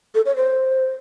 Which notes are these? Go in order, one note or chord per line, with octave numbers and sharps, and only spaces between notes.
A4
C#5
C5